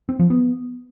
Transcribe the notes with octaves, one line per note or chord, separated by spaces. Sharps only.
C4
F3
B3